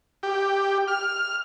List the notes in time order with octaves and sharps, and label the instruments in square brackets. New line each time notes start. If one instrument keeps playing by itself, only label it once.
[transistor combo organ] G4
F6